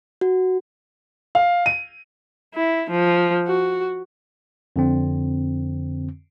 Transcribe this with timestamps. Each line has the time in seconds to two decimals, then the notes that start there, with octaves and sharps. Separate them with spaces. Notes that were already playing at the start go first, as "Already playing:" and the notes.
0.21 F#4
1.35 F5
1.66 D#7
2.54 E4
2.90 F3
3.47 F#4
4.76 F2 D3 C4